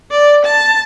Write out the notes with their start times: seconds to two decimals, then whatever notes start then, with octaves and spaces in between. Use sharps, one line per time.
0.11 D5
0.45 A5